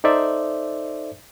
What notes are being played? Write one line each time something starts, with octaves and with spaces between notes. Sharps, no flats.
D#4 A4 C5 D5 E5